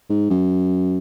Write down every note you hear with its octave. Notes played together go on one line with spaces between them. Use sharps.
G#2
F#2